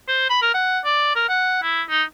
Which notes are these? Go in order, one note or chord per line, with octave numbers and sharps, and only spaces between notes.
C5
B5
A#4
F#5
D5
A#4
F#5
E4
D#4